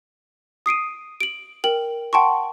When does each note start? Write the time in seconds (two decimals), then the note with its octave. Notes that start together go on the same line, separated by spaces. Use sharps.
0.66 D#6 C7 D7 D#7
1.21 D7 F#7
1.64 A#4 G5 F#7
2.13 F#5 G5 A5 C6 C#6